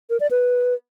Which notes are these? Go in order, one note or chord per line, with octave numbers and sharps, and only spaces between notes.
A#4
D5
B4